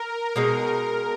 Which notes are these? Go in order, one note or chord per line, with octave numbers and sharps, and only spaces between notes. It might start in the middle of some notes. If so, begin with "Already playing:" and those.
Already playing: A#4
B2 G#3 D#4